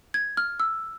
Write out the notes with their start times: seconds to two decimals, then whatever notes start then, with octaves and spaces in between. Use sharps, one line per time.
0.14 G#6
0.37 F6
0.60 E6